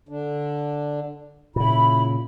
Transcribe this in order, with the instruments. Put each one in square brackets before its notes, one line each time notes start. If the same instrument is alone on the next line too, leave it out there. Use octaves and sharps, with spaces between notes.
[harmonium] D3 D4
[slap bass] A#2 C#3 [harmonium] E4 [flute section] B5